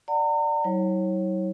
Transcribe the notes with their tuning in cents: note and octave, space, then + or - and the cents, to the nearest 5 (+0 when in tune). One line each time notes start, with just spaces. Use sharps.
D5 +0 F#5 +0 A#5 -40
F#3 +40 E4 -35 C#5 -30